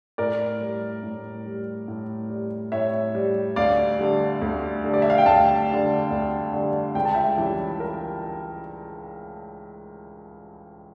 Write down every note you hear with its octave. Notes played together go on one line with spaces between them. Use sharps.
A2 A#4 D5
G3
A2
G3
A2
G3
A2 C#5 E5
G3
D2 D5 F5
D3 G3
D2
D3 G3
D5
E5
F5
G5
D2 F5 A5
D3 G3
D2
D3 G3
C#2 G5
A5
E5 G5
C#3 E3 G3
A#4